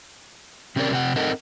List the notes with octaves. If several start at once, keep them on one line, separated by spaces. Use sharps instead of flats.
C3 C4 C#4 G#4 A#4 D5
C3 C4 F#5
C4 D#4 A4 A#4 D#5 F#5